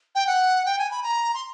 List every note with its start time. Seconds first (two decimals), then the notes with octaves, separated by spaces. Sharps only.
0.15 G5
0.27 F#5
0.65 G5
0.79 G#5
0.91 B5
1.03 A#5
1.34 C6